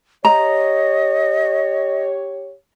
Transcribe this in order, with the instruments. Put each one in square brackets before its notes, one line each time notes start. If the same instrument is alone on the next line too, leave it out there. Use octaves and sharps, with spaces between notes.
[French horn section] G4 C#5 [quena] D#5 [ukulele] A#5